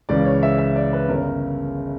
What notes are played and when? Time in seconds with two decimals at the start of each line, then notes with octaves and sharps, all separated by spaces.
0.09 C#2 C#3 E3 D5
0.25 C#5
0.43 E5
0.58 E5
0.76 D5
0.93 B4
1.09 G1 C#3 A#4